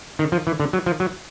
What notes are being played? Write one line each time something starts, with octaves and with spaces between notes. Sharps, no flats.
D#3
F3
E3
D3
F#3
F3
F#3